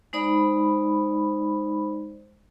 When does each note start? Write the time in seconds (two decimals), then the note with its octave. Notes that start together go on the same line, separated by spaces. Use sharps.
0.13 G#3 D#4 C5 D5 B5